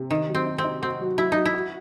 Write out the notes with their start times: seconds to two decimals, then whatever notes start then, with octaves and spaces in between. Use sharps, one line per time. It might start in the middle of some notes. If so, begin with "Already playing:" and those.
Already playing: C3
0.11 D#3 D#4
0.29 F#3
0.35 C4
0.46 D#4
0.58 C4
0.64 D#4
0.82 C4 F#4
1.01 F#3
1.18 F#3 E4
1.32 F#3 D#4
1.45 E4
1.54 F#4